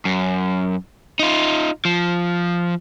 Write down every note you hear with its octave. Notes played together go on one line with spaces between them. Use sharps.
F#2
D#4 F4
F3